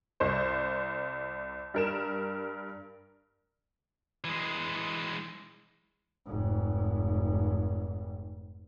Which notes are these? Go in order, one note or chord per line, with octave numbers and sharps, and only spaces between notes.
C2 C5
G2 A#4 E7
E3 G#3
F1 G#2